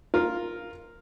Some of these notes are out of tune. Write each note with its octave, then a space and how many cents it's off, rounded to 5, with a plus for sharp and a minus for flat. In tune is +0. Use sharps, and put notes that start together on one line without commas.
F4 +0 A#4 +0